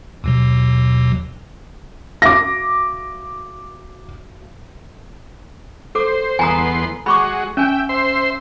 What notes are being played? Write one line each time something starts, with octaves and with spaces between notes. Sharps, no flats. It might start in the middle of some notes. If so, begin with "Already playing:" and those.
D#2 B2 F#3
F#4 E5 F5 D6 A#6
A4 C5 D6
E2 B3 G#5 A#5 C6 D#6
G#3 F#4 B5 C#6 D6
C#4 E5 G5 G#5
C5 E5 C6